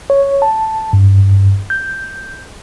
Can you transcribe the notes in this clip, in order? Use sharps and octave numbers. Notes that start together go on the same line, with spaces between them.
C#5
A5
G2
G6